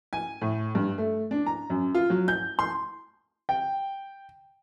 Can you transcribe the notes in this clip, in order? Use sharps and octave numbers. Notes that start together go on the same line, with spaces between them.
G#5
A2
G2
A3
D4
A#5
F#2
F4
F#3
G6
C6
G5